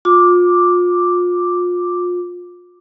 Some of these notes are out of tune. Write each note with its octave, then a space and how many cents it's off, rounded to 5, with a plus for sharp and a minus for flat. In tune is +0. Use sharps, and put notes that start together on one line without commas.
F4 +30 D6 +0